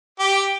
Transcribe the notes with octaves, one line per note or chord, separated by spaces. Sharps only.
G4